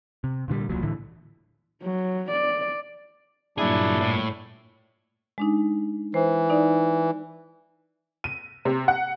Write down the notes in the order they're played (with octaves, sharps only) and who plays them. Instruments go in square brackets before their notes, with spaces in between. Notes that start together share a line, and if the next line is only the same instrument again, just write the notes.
[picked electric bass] C3
A#2 D3 D#3 G3
D#1 C2 A#2 F#3
A2 D3 E3
[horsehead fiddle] F#3
D5
[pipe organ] G2 A#2 [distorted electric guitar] F#3 G#4 [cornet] D4 [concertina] E4
[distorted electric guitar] A2
[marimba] G#3 D4 D#4
[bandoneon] E3 [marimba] C5
[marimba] D#4 D5
[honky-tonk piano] D#7
C3
F#5